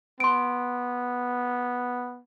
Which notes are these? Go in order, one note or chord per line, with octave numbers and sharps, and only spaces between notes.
B3 C6 D7